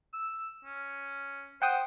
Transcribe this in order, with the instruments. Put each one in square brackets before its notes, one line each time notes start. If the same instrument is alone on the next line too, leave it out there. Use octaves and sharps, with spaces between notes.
[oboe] E6
C#4
[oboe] C5 [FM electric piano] F#5 G5 D#6